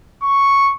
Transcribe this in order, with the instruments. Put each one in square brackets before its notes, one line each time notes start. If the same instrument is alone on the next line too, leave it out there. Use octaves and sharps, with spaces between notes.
[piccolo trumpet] C#6